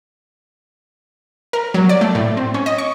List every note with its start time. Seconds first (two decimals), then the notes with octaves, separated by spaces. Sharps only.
1.53 A#4
1.74 F#3
1.89 D5
2.01 A3
2.15 A2
2.37 C4
2.54 C#4
2.66 D#5
2.78 C#6